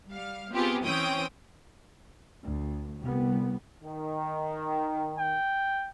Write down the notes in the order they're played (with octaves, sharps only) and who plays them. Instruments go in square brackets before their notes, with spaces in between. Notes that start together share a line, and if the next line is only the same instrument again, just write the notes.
[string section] G3 F5
B3 C4 F4 G4 G#4
E3 C4 C#4 G5 D#6
[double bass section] D2
C2 G3 B3
[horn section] D#3
[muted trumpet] G5